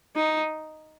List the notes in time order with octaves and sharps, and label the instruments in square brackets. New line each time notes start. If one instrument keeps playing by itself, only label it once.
[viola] D#4